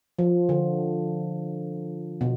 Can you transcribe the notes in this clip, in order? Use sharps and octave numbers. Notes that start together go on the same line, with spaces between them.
F3
D3
B2